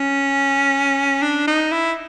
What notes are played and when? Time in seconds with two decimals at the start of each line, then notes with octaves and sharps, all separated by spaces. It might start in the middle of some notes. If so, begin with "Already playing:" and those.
Already playing: C#4
1.23 D4
1.47 D#4
1.72 E4